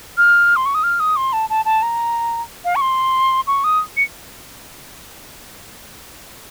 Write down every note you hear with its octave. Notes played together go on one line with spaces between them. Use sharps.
F6
C6
C#6
D#6
F6
D#6
C6
A5
A5
A5
A#5
F5
C#6
C6
C#6
D#6
C#7